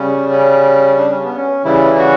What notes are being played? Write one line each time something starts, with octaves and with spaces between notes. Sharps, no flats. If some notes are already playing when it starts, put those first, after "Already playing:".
Already playing: C#3 G3 C#4
C#4
D4
C#4
B3
C#4
C#3 E3 G3 E4
F#4